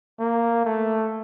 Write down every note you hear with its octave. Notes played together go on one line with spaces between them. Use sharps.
A#3
A3